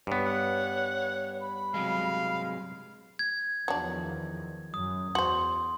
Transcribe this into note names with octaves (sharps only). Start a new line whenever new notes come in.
G2 B3 C#5
F#5
B5
C3 F#3 G#3 F5
G#6
E2 D#3 F3 F#3 D4
F#2 D#6
E2 F#4 C5 C6